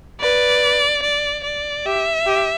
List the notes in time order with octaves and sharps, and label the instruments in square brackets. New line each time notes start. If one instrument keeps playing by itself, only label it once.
[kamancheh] B4 [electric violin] D5
[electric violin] D5
D5
[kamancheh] G4 [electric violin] E5
[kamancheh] G4